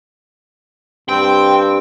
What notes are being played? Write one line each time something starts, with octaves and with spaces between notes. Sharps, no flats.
G2 C4 G5